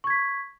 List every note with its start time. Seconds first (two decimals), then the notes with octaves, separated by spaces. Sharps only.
0.04 C#6
0.07 G#6
0.10 B6